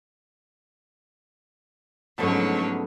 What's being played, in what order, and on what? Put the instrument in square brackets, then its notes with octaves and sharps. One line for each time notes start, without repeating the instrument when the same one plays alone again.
[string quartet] G#2 D3 F3 [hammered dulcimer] B2 A3 [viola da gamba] F#3 C#4